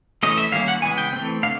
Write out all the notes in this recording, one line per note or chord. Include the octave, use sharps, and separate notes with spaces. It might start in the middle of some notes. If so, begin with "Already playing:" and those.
E3 A3 C#4 D#5
E5
D#3 G3 A#3 C#4 F5
F#5
C#3 E3 G#3 B3 G#5
G5
E3 A3 C4
D3 F5